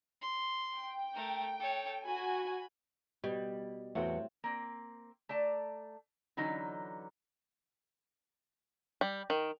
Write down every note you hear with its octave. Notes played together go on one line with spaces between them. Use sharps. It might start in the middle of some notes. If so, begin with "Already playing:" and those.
C6
G5
A3 A#4
A4 C#5
F#4 G#5 B5
B2 G3
E2 A2 C4 F#4 F#5 G5
A#3 C4
A3 D5 A5 A#5
D3 E3 F#3 C#4 D#4
G3
D#3